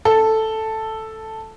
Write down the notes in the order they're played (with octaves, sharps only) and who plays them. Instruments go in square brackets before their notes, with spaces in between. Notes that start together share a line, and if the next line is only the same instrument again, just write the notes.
[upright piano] A4